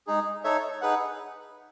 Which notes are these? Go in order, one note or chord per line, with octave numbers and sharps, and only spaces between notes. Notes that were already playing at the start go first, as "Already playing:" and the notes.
G#3 D#4 G#4
D#4 A4 C#5 E5
D#4 G#4 B4 F#5